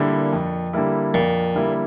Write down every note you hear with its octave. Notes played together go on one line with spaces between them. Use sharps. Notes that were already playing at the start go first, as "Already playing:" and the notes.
Already playing: A#2 D3 G3 A#3 E4
F2
D3 G3 A#3 E4
F2 A#2
D3 G3 A#3 E4